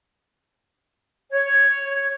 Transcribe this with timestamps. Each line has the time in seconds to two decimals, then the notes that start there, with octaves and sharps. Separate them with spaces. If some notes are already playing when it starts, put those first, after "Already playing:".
1.31 C#5